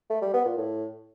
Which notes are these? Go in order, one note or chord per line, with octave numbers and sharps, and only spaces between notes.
A3
G3
B3
A#2
A2